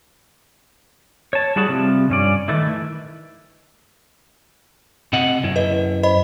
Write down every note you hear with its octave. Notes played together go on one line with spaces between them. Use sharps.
C#5 A5
G3 E4 F#4 G#4 A5
C3 F3 G3
G2 C#4 D5
D#3 E3 A3 E4
C3 D#5 F#5
F#2 E4
B4 D#5
C5 D#5 B5